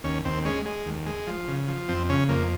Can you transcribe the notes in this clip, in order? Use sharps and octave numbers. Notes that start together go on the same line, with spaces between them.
D#2 C#4
D#2 C4
G#3 C#4
G#3
D#2
G#3
F3
C#3
F3
F2 C4
C#3 C#4
F2 A#3